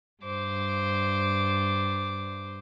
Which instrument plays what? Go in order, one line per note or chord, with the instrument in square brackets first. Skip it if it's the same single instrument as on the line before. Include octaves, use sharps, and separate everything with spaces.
[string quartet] G2 C5 D6